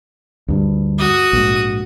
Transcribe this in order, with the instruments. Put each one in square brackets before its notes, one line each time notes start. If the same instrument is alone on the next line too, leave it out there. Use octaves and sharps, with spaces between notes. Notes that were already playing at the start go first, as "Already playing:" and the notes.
[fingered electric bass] D2 G2
[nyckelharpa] F#4 D#6
[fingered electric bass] A#1 G#2